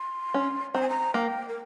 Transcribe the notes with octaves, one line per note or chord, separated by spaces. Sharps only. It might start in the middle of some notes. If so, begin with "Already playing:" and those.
Already playing: C6
C#4
C4 A#5
G#5
A#5
A#3 G5
A#4